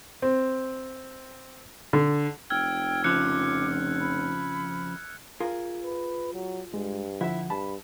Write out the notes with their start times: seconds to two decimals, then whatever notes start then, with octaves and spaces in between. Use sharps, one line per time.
0.22 C4
1.93 D3
2.50 F1 G5 E6 F6 G#6
3.04 F2 C#3 F3 D6 F#6 C#7
4.01 B5
5.40 F4 G#4 A#4
5.83 B4
6.33 F#3
6.74 G2 G#3
7.21 D3 F3 E4 E5 F#5
7.50 G2 A5 B5